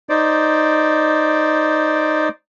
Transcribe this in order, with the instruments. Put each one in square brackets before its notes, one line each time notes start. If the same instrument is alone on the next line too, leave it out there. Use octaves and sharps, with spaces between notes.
[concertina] D#4 C5 D5